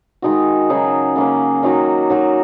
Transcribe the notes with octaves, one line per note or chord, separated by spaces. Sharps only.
D#3 G#3 D#4 F#4
C#3 F#3 D#4 G#4
C#3 A#3 C#4
D#3 F#3 D#4 F#4
F#3 D#4 F#4 A#4